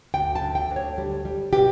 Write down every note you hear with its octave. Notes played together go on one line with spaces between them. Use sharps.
D2 G5
A5
D3
G5
D2
C#5
G3
G3
B2 G4